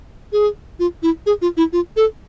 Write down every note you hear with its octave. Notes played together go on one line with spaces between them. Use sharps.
G#4
F4
E4
G#4
F4
E4
F4
A4